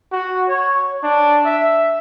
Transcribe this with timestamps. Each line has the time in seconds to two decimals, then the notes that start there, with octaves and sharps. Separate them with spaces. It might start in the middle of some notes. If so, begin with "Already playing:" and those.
0.12 F#4
0.49 C#5
1.03 D4
1.45 E5